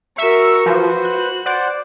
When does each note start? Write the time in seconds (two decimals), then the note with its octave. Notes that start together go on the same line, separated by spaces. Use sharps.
0.18 F#4 A#4 E5 C#6
0.66 F3 F#4 B4 C5
1.05 F#6
1.46 C5 D5 F#5